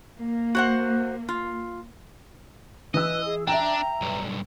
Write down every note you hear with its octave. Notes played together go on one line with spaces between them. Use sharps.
A#3
F#4 C5 F#5
F4
E3 B4 D#5 E6
G#4
D4 E5 G5 A#5
B1 G2